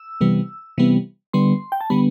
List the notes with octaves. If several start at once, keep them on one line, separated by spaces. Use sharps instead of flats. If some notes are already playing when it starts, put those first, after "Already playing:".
Already playing: E6
C3 E3 G3 B3
C3 E3 G3 B3
D3 G3 B3 C6
G5
A5
D3 G3 B3 B5